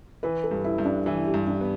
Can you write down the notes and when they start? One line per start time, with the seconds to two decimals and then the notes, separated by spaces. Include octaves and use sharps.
0.23 E3 B4
0.44 A4
0.51 G2
0.64 E4
0.78 G2
0.85 D4
1.06 E3 E4
1.27 G4
1.34 G2
1.47 D4
1.61 B3